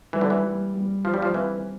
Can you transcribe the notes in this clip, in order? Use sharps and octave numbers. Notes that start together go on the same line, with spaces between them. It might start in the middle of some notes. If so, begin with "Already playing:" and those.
E3 G3
D3
E3
G3
G3
F3 G4
G3
F3
E3 C4